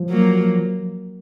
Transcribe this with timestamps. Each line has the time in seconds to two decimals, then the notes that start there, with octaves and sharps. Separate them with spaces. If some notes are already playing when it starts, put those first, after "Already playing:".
Already playing: F3
0.10 F#3 A#3